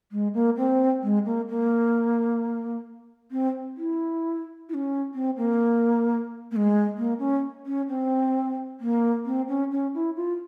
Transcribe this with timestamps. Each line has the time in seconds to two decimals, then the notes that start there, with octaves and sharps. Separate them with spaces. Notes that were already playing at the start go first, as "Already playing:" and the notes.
0.12 G#3
0.34 A#3
0.57 C4
1.03 G#3
1.25 A#3
1.48 A#3
3.31 C4
3.77 E4
4.69 E4
4.74 C#4
5.14 C4
5.37 A#3
6.51 A#3
6.56 G#3
6.97 A#3
7.19 C#4
7.66 C#4
7.89 C4
8.80 A#3
9.26 C4
9.48 C#4
9.71 C#4
9.94 E4
10.16 F4